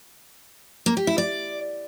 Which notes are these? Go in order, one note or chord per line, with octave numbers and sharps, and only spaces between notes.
A#3
G4
E4
D5